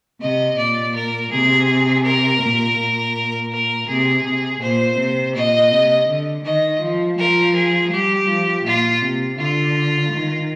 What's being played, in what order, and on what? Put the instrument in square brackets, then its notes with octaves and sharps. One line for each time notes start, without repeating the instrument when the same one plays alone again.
[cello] C3 [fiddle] D#5
[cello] A#2 [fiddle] D5
[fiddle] A#4
[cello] C3 [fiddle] G#4
[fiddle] A#4
[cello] A#2
A#2
[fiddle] A#4
[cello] C3 [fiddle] G#4
[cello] C3
[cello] A#2 [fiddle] C5
[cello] C3
[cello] A#2 [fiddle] D#5
[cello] C3
D3
[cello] D#3 [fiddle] D#5
[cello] F3
[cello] F3 [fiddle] A#4
[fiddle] G#4
[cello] G3 [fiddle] G4
[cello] F3
[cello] A#2 [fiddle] F4
[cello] C3
[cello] D3 [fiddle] F4
[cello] D#3